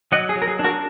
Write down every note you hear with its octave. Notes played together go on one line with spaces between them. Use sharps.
F#3 D#5 F#5
G#4
F#3
A#4
G#4
D4
F#4 A#4